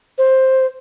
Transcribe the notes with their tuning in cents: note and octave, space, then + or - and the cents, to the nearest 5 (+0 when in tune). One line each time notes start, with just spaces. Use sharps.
C5 +10